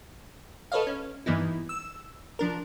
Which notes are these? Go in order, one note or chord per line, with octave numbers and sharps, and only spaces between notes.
A4 B4 C#5 D#5 F5
C#4
G2 E3 A#3 B3 D#4 E4
E6
F3 D4 A#4